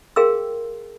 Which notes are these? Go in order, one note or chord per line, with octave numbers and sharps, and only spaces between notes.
G#4 A#4 F5 G5 C6 E6